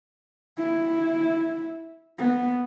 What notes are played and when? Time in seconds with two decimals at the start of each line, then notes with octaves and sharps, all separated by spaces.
0.58 E4
2.19 B3